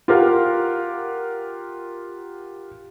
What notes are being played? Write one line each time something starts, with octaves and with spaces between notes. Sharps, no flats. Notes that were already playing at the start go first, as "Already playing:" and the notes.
F4 G4 A#4 F5 F#5